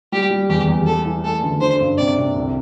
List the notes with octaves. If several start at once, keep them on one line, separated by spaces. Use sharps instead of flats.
G3 G4
G3
E2 G4
E2
G3 A4
E3
A3 A4
D2
D4 C5
G2
C3 D5
C3
C2